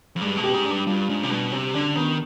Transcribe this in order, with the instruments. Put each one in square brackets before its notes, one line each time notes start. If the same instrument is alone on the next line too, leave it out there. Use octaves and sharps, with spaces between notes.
[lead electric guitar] F2
[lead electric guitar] G2 [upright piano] G#3
[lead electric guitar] B2
[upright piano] G4
[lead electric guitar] G#2
[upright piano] D4
[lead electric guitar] G2
[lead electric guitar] G2 [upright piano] F4
[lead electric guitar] G#2 [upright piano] D4
[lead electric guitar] C3
[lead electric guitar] B2 [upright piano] G3
[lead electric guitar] C3 [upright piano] G4
[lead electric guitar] D3 [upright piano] D4
[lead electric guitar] D#3 [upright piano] B3